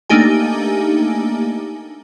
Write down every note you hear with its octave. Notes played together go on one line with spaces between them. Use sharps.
A3 A#3 D4 D#4 G4 G#5